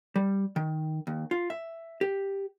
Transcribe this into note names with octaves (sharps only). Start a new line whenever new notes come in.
G3
D#3
D#2
F4
E5
G4